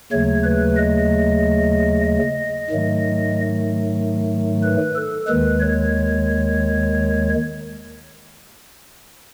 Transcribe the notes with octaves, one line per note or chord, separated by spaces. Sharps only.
D#2 C#3 F#3 A3 C#5
B4
D#5
D#5
G#2 D#3 F#3 A3
B4
A4
D#2 D#3 G#3 B4
C#5